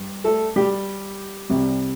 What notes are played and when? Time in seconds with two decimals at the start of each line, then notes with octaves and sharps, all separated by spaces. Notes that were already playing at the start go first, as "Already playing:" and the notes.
Already playing: G2
0.24 A3 A4
0.56 G3 G4
1.50 C2 C3 G3